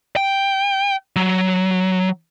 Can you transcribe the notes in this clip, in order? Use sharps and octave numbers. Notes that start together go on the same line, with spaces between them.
G5
F#3